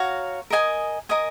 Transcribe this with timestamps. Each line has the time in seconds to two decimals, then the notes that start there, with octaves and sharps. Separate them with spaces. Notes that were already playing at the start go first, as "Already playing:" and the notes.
Already playing: F#4 C#5 F5 A#5
0.50 A#4 D#5 G#5 D#6
1.09 A#4 D#5 G#5 D#6